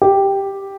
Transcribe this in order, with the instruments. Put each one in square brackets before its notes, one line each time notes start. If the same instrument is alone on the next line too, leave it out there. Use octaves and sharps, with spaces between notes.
[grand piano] G4